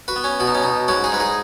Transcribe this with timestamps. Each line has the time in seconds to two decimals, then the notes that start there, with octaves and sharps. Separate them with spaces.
0.08 F#4 B4
0.16 B3
0.24 C#4
0.40 B2 F#4
0.47 D#4
0.55 C#4
0.63 B2 D#4
0.88 G#2 C#4 F#4
1.04 D#4 G#4
1.12 G#2 B4
1.20 D#4 G#4